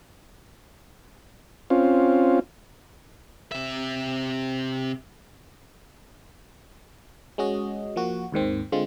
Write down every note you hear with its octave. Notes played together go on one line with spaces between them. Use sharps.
C4 C#4 F4
C3 E5
G#3 C#4 F#4 D#5
F3 A#3 F#4
D#2 G#2 D#3 C4
D3 G#3 C4 F4